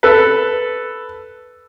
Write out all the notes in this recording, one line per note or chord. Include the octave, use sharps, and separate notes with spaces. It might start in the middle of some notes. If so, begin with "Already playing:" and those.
A4 B4